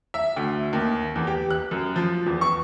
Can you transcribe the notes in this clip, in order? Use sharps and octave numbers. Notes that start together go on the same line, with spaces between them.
E5
D2
D#2
E2
G4
F#6
F#2
F3
E2
C#6